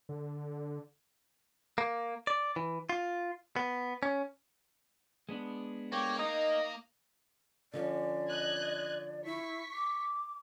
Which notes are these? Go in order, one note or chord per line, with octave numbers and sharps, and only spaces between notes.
D3
A#3
D5
E3
F4
B3
C#4
G#3 B3 D4
A#3 G4 C#5
D#4 A#5 D#6
D3 F3 C#4 D5
D#5 F#6 G#6
E4 C#6 B6
D6